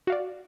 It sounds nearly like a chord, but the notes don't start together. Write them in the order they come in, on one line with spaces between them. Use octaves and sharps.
F#4 F5 D5